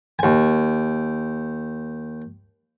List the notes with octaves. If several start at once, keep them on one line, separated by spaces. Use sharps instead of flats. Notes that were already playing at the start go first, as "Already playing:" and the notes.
D#2 G#5